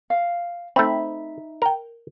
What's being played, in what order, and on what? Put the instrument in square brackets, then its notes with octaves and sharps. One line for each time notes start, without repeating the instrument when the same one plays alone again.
[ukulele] F5
[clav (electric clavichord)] A3 C4 [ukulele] D#4 E5 B5
[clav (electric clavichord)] A#4 G5